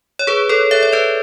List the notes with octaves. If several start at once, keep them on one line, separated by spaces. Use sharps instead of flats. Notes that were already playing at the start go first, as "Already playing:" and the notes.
C#5
G#4 B4
A4 C#5
C#5 E5
C#5
B4 D5